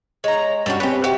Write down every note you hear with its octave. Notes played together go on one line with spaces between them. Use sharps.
G#3 C#5 A#5
G2 G3 C#4 D4 F#4
C4 C#4 G4 B4
F#4 G4 E5